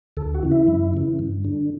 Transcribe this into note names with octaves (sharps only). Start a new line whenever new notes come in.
D2 A4
F#4
C#3 E3
E4
F#2
C#3 E3
G2
D3